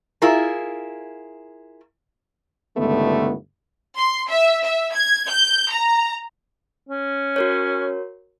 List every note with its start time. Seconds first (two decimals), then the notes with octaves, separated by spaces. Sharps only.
0.22 E4 F4 G#4 A#4
2.77 G1 C#2 D3 D#3 A3 B3
3.98 C6
4.29 E5
4.63 E5
4.94 G#6
5.27 G6
5.70 A#5
6.89 C#4
7.36 F#4 A#4 C#5